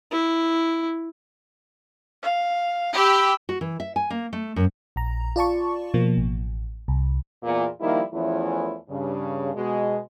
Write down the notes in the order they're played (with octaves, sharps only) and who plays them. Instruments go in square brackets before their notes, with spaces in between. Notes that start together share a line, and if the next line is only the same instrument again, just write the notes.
[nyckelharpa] E4
[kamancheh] F5
[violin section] G4 [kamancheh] B5 E6
[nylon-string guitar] F#4
E3
E5
G#5
A#3
A3
F#2
[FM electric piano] A#1 A#5
F4 D5 A5 C#6
B2 F3 A#3
A1
C2
[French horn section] E2 A#2
D#3 F3 G3 A#3 D#4 E4
E2 E3 F3 A3 C#4 E4
G2 C#3
B2 G#3